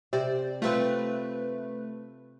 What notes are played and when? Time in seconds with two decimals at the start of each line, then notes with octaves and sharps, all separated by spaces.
0.13 C3 C5 D5
0.62 A3 C4 F4 B4